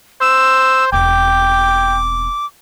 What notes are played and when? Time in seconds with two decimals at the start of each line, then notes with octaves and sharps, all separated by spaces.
0.21 C5 E6
0.92 E1 C4 G5 D6